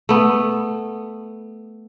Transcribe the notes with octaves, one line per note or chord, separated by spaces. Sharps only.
A3 B3